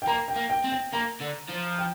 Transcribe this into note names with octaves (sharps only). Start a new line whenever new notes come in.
G5
A#3 A#5
G5
A#3
G5
C4
G5
A#3 A#5
D3
F3
G5